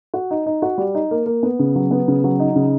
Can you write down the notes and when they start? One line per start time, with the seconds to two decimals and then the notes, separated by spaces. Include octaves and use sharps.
0.14 F#4
0.31 D#4
0.46 D#4
0.62 F#4
0.78 G3
0.95 D#4
1.11 A#3
1.26 A#3
1.43 B3
1.59 C#3
1.75 F#3
1.91 B3
2.08 C#3
2.24 F#3
2.39 D#4
2.56 C#3